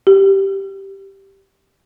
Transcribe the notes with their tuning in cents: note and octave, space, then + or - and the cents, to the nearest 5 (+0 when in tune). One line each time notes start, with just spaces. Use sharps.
G4 -5